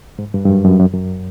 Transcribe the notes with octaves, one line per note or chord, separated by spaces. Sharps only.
G#2
G2
G2
F#2
F#2
F#2
F#2